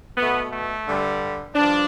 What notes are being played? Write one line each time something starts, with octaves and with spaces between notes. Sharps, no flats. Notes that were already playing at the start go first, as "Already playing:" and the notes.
B2 A3 B3
A3
G2 D3 G3
G2 F3 D4